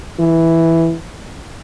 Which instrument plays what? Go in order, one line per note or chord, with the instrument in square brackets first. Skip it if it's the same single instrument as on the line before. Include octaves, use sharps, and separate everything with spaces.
[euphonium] E3